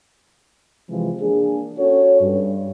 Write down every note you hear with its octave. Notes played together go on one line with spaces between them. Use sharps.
C3 E3 F3 G#3
A#3 D4 G#4
C#4 F#4 A4 C#5
G2